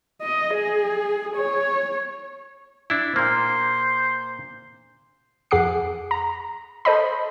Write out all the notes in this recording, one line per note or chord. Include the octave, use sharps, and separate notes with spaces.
D#5
G#4
C#5
D4 E4
A#2 A#3 C5
F2 G#4 F#5 D6 C7
A#5
A4 C5 D#5 B5